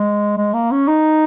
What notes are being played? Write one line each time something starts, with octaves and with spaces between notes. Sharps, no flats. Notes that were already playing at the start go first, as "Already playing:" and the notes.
Already playing: G#3
G#3
A#3
C#4
D#4